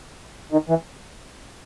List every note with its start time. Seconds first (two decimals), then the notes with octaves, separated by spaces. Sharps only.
0.52 D#3
0.69 E3